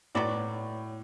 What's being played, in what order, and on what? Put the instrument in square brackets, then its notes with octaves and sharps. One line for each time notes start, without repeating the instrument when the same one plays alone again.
[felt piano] A2 [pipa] F#3 B3 F#4 D5